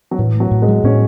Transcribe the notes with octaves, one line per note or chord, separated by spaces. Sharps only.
F#3
A2 E3
A3
F#3
A2
G#3
F#3
A2 C#4